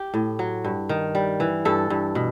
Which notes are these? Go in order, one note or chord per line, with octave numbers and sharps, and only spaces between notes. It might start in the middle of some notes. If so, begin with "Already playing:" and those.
Already playing: G4
A2
F#3
G2
D#3
G3
E3
G2 A4
G2
B2